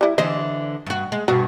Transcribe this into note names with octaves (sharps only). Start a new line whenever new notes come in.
G3 E4
D3 E3 C5 D#5
G2 F#4
G#3
G2 B2 F#4